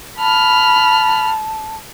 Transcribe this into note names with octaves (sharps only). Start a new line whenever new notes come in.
A5 B5 F6